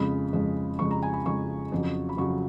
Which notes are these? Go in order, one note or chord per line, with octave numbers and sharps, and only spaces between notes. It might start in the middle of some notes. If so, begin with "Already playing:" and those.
Already playing: F2 C#3 G#3 B5
F2 C#3 G#3
F2 C#3 G#3 C#6
A#5
G#5
B5
F2 C#3 G#3 C#6
F2 C#3 F#3
B5
F2 C#3 F#3 C#6